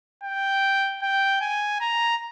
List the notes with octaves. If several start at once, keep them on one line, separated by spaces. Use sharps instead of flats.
G5
G5
G#5
A#5